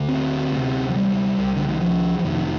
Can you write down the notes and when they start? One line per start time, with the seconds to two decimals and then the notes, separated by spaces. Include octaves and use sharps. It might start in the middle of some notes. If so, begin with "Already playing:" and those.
Already playing: D2 D3
0.08 C4
0.51 D2
0.56 C3
0.89 F3
0.95 G3
1.38 C2 C3
1.56 D3
1.69 D#3
1.81 F3
2.19 F3
2.25 F1 F2 C3 D#3